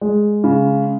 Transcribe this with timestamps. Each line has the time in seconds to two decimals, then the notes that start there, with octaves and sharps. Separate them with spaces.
0.01 G#3
0.44 C#3